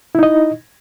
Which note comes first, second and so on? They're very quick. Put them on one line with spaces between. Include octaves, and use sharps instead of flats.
E4 D#4 D#5